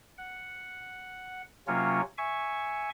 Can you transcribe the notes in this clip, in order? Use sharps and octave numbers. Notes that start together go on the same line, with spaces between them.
F#5
C3 F#3 A#3 C#4 F4 C#5
E5 G#5 C#6